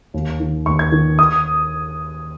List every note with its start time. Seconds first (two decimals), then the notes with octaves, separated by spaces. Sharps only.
0.14 D#2
0.40 D#3
0.66 D#2 C#6
0.79 G#6
0.92 D#3
1.19 D#6